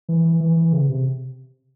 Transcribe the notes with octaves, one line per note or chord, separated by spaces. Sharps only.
E3
E3
E3
E3
C#3
C3